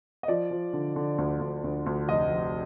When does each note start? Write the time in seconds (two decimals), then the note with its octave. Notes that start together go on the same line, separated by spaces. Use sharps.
0.23 D#5
0.28 F3 D5
0.51 F3
0.73 D3
0.96 D3
1.18 D2
1.41 D2
1.64 D2
1.86 D2
2.08 F1 D#5
2.31 F1